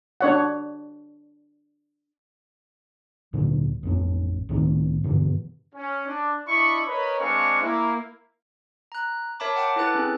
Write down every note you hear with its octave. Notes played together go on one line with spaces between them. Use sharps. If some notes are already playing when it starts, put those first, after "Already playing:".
D4 C#5 F#5
D2 A#2 D3 F#3
A1 F2 C#4
C#2 A2 D#3 C4
G2 B2 D3 E3
C#4
D4
D4 E4 D#5 B5 C#6
A#4 B4 C#5 D#5 B5
G#3 C4 D4 F5 G#5 C#6
A#3 E4
A#5 F#6
A#4 C#5 E5 A5 B5 D6
F#5 G5 A5 D6
E4 A4 B4 F#6 A6
C4 C#4 G#4